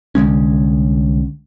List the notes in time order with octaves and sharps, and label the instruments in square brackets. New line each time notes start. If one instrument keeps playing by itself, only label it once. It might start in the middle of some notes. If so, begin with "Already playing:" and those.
[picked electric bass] C2 D3 G#3 C#4